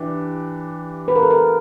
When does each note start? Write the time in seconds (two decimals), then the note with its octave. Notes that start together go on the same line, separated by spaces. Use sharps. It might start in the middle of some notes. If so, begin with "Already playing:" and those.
Already playing: E3 D4 G4
1.08 B4
1.15 A#4
1.23 A4
1.31 A#4